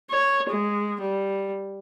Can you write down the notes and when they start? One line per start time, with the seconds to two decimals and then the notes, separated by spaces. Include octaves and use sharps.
0.10 C#5
0.49 G#3
1.01 G3